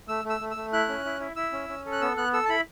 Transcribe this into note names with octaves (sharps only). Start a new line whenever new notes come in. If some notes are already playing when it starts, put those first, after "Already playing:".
A3 E6
A3
E6
A3
A3 E6
E4 F#6
C#4
E4
E4
E4 E6
C#4
C#4
A4
F#6
B3 E6
B3 F#6
A4 E6
A5
E4 B5